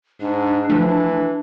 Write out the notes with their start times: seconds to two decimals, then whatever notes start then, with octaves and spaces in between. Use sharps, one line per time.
0.20 G#2 D4
0.69 E3 F3 A3